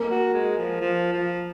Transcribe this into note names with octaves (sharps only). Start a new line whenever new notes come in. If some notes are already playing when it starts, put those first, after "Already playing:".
Already playing: A#3
F#4
G#3
F3
F3
F3